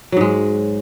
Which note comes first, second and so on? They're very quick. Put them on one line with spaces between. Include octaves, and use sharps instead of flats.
F#3 G#2 G#3